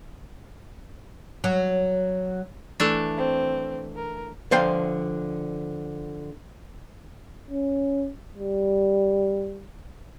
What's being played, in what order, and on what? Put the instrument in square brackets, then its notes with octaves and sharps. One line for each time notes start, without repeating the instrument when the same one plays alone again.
[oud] F#3
[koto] E3 A3 D4
[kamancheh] C4
A#4
[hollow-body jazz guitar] D3 F3 C5 F5 G5
[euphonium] C#4
G3